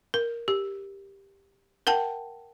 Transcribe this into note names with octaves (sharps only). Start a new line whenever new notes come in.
A#4
G4
A#4 F#5 G5 A5